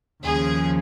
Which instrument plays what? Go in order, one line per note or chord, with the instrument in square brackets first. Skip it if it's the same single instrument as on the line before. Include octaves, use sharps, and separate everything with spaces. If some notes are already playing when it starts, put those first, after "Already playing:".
[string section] D#2 C#3 F3 G#4